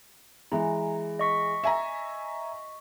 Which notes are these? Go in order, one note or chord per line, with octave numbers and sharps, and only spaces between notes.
E3 G#3 A#5
D#5 C#6 B6
E5 G#5 A#5